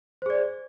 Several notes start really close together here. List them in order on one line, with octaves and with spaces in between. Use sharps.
C5 G#4 D5